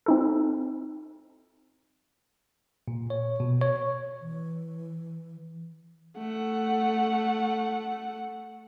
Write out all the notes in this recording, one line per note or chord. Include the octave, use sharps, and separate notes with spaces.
C4 D#4 A4
A#2
C#5
B2
C#5
E3
A3 F#5